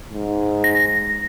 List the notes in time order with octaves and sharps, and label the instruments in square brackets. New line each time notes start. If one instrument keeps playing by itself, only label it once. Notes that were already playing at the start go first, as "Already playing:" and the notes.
[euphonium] G#2
[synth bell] A#6